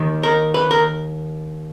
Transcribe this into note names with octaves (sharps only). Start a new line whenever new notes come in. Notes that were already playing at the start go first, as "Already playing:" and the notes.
Already playing: D#2 D#3
A#4
B4
A#4